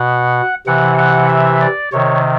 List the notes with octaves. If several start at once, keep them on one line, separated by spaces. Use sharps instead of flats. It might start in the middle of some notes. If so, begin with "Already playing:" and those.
Already playing: B2 F#5
C3 E3 F#5
F#5
E5
D5
C3 D#3 C#5